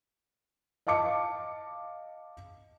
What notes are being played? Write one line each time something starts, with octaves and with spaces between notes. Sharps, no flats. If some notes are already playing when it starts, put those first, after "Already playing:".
D#5 F5 A5 D6 C#7